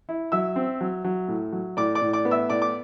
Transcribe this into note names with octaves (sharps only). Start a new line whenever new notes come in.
E4
F#3 E5 E6
C4
F#3
F#3
A2
F#3
A2 D5 D6
D5 D6
A2
D5 D6
B3
E5 E6
A2 D5 D6
D6